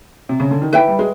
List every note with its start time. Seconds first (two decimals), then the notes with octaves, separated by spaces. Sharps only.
0.29 C3
0.40 C#3
0.51 D3
0.62 D#3
0.72 E3 B4 E5 G5
0.88 G3
0.99 G#3